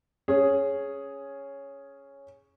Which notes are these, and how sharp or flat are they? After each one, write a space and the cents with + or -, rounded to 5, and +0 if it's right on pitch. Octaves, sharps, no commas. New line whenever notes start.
C#4 +0 G#4 +0